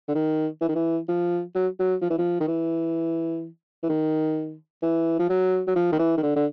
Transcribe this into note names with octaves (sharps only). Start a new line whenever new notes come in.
D3
D#3
E3
D#3
E3
F3
F#3
F#3
F3
E3
F3
D#3
E3
E3
D#3
E3
F3
F#3
F#3
F3
D#3
E3
D#3
D3
D3